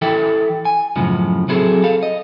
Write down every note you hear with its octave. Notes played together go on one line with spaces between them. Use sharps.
E3 E4 A4 E5 G5
G#5
F#2 A2 C#3 F3
F#3 C4 E4 G#4 A4
A4 F5
D#5